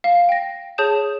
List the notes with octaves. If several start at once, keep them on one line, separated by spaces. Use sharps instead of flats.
F5
G5 A#6
G#4 C#5 A5 D#6 G6 E7